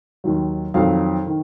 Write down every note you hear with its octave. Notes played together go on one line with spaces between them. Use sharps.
D#2 D#3 F#3
F2 D#3 F#3 F5
D#3